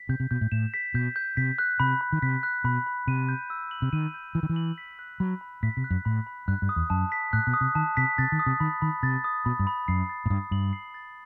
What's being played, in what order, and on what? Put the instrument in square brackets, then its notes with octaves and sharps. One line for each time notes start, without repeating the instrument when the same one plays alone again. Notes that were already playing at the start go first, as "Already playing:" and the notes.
Already playing: [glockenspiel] B6
[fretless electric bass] C3 [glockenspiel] G6
[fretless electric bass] C3
[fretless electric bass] B2 [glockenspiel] G6
[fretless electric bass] A2
[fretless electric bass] A2 [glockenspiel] E7
[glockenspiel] B6
[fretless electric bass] B2 [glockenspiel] G6
[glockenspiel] G6
[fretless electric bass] C3 [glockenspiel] B6
[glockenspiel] F#6
[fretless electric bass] C3 [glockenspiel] B5
[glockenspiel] B5
[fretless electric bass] D#3
[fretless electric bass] C3 [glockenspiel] B6
[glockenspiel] F#6
[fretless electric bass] B2 [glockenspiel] B5
[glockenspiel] B5
[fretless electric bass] C3 [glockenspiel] D#7
[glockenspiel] G6
E6
F#7
[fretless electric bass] C3
[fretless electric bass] D#3 [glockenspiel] D#7
[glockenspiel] G6
[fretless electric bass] E3 [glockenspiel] E6
[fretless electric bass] D#3
E3
[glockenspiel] F#7
B6
F#6
[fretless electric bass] F#3 [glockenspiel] B5
[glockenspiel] B5
[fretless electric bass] A2 [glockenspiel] B6
[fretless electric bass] C3
[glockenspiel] F#6
[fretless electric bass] F#2
[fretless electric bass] A2 [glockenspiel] B5
[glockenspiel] B5
[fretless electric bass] G2 [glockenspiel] F#6
[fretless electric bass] G2
[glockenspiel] D#6
[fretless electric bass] E2
[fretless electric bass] F#2 [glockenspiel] A5
[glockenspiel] B6
[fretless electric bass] A2 [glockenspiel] F#6
[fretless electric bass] B2
[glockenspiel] D#6
[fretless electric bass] C3
[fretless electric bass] D#3 [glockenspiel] A5
[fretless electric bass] C3 [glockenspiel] B6
[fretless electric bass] C3 [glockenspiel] A6
[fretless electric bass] D#3
[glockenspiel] D#6
[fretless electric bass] C3
[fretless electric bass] D#3 [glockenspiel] B5
[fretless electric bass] D#3 [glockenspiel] B5
[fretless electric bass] C3 [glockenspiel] A6
[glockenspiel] D#6
[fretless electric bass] B2 [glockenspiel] B5
[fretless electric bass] G2
[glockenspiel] B5
[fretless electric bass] F#2 [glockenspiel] C7
[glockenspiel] A6
[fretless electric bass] A2
[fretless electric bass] G2 [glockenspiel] D#6
[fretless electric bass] G2 [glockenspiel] F#7
[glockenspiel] C7
A6